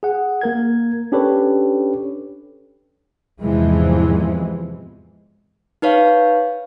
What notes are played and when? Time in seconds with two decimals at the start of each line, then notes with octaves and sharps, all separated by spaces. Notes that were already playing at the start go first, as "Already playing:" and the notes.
0.03 G#4 F#5
0.41 A#3 A#4 G#6
1.12 C#4 D4 G4 A4 B4 C#5
3.43 E2 G#2 C3 E3 F3 G#3
5.82 D#4 B4 C#5 F5